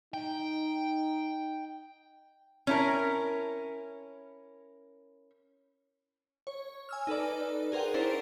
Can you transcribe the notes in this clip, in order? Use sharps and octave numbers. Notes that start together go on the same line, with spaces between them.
D#4 G5
C#4 E4 A#4
C#5
G#5 E6 F6
D#4 A4 B4 D5
G#4 A#4 C5 F#5 G5
D4 E4 A#4 C5 C#5 D7